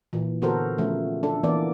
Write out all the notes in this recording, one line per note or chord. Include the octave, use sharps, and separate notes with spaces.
A#2 E3
D3 B3 F#4 A4 A#4 C5
C#3 F3 A3
D4 A4
E3 A#3 B3 D4 D5